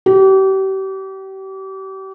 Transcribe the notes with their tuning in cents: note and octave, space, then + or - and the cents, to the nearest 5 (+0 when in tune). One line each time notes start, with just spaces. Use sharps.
G4 -35